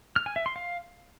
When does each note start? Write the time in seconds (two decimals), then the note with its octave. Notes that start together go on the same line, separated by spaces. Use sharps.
0.16 F6
0.26 G#5
0.36 E5
0.46 C6
0.56 F5